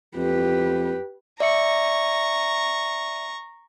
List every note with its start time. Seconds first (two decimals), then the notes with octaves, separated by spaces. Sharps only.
0.16 F2 G4 B4
1.40 D5 E5 A#5 C#6 C#7